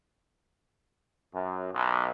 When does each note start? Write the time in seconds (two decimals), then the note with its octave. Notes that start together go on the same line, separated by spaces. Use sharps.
1.34 F#2
1.74 B1